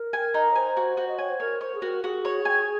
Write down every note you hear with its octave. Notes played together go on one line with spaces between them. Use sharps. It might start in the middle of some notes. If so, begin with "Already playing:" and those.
Already playing: A#4
G#5
D#4
C#5
C5 G#5
F#4
F#4
D#5
C#5 G#5
C5
A#4 C#5
C5 C#5
G#4
F#4 A#4
F#4 G#4
C#5
G#5